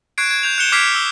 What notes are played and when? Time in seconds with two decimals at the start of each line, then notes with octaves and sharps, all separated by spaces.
0.18 C#6 F#6 G#6 C7 D7
0.31 G#6
0.43 G6 F7
0.58 F#6 G6 C#7 E7 G7
0.72 D6 F6 G#6 B6 C7 D7
0.95 E6